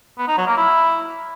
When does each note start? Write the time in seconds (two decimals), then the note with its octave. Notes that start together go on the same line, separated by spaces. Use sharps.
0.18 B3
0.28 D#4
0.37 F#3
0.47 A#3
0.57 E4